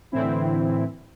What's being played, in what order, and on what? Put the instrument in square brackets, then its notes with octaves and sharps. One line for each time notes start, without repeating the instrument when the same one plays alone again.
[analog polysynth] A2 D3 E3 C4 E4